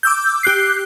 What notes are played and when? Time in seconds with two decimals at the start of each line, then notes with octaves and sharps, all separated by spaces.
0.03 D6 E6 G6
0.43 G4 F#6 C7